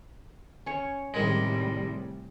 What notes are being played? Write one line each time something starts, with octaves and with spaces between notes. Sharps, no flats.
C#4 C#5
A2 C3 D#3 G3 G#3